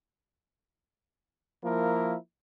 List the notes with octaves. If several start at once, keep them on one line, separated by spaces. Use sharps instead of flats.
F3 A#3 E4 A#4